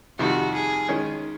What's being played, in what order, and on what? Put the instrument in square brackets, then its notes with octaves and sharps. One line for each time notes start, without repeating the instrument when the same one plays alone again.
[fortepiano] F2 C3 D#3 G3 [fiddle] F#4
[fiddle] G#4
[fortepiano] D#3 G#3 C#4